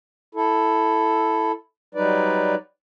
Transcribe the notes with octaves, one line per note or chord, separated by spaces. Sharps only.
E4 A4
F#3 G3 D#4 B4 D5